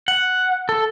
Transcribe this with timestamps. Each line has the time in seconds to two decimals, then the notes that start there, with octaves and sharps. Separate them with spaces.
0.08 F#5
0.69 A4